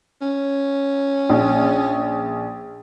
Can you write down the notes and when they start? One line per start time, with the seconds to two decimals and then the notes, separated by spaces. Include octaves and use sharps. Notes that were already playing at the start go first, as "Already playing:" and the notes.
0.21 C#4
1.30 A#1